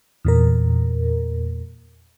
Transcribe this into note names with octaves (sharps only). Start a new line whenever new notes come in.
E2 A#2 A#4